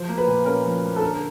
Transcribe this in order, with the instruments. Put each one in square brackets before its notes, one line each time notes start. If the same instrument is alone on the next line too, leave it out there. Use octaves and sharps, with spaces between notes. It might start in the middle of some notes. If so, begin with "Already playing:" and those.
Already playing: [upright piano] F3 C5
A#3
B4
A#2
C#4 A#4
F3
A#3
A4
D3 A#4